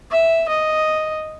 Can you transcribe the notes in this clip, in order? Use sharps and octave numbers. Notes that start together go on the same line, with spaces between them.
E5
D#5